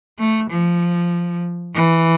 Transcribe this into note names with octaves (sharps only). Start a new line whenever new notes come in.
A3
F3
E3